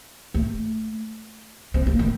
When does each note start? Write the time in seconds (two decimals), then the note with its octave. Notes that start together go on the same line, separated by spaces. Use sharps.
0.34 A3
1.74 C4
1.87 A#3
1.99 A3